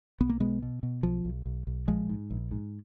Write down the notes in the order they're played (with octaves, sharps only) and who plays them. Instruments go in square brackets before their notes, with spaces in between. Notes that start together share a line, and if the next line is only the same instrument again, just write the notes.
[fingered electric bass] B1 B3
A#3
B2 G#3 B3
B2
B2
B1 F3
B1
B1
B1
A#1 F3 G#3
G#2
A#1
G#2